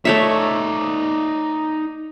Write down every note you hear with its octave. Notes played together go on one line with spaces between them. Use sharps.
A3 D#4 C#5 D5 E5